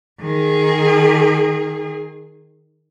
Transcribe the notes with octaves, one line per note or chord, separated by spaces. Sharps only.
D#3 G#4